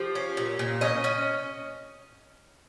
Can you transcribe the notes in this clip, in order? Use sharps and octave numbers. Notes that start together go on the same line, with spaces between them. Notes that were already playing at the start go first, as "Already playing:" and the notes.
Already playing: F3 G4
C#4
A#2
A#2
C#4 D#5
C#4